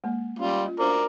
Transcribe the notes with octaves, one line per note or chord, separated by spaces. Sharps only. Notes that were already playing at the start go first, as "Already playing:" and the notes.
G#3 A#3
G3 C#4 F4
F4 D#5
D4 F#4 A#4 C5 D5